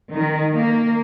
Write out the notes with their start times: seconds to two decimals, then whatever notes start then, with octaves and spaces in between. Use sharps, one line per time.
0.14 D#3
0.55 A#3